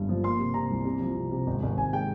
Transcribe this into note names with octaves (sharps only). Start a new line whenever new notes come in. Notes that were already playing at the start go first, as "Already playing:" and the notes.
Already playing: G1 G2
F3
A#3 C6
C3
C3 A#5
C2
C3
F3
C3
C3
G#1
G#1
G#1 G#5
G#3 G5